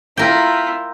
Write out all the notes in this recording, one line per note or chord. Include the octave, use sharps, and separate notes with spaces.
E4 F4 A#4 G5